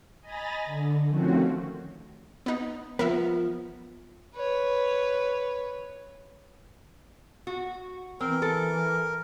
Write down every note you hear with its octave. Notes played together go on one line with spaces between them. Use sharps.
D#5 G#5 A#5 B5 A6 A#6
D3
D#3 F3 A3 C4 C#4 F#4
B3 D#4
F3 B3 A#4 B4 E5
B4 C#5
F#4
E3 C4 A#4
A4